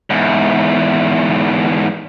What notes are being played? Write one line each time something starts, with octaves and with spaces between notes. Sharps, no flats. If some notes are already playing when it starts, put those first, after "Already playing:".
E2 G#2